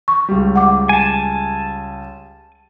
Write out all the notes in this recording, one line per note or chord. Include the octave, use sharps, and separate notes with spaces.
C#6
C#2 G3
F#5 D6
G#5 A5